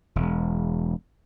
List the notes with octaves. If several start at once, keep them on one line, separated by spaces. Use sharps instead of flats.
E1